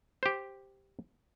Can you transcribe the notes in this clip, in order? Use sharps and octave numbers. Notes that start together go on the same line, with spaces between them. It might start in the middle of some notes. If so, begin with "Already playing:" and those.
G4 C5